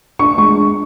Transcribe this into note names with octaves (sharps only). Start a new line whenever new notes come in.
D4 C#6
G#3 C#6
D4